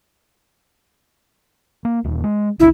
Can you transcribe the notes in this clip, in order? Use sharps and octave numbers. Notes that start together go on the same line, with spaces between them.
A#3
D1 D#2
G#3
G1 C#2 D4 E4